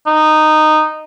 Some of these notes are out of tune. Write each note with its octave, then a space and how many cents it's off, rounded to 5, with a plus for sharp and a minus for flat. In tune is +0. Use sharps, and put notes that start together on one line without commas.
D#4 -10